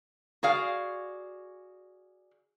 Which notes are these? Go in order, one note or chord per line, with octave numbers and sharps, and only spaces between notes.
F#4 G#4 D5 F5